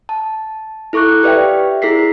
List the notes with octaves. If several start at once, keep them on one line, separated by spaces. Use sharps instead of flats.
A5
E4 A4 C#6 D6 F#6
G4 B4 D5 E5 F5 G5
E4 G#4 A#4 B6 C7